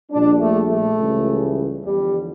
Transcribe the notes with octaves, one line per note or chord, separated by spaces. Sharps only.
A#1 A#2 G3 D4
A3
A3
C#2 C#3 E3 G3
E2 D3 F3 G3